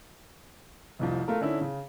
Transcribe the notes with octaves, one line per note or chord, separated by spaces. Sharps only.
F1 C2 F3
A3 F4 A#4
D3 C#4 D#4 E4
C#3